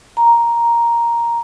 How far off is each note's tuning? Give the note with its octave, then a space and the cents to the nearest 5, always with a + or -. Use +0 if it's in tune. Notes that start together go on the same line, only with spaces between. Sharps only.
A#5 +5